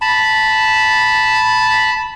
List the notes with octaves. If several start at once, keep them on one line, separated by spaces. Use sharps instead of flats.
A5 B5